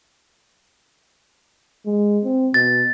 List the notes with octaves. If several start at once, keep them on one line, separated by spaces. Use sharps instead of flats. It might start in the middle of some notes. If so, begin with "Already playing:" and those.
G#3
C4
B2 A6